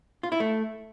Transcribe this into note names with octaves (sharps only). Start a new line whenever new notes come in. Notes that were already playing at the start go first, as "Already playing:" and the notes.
F4
E4
A3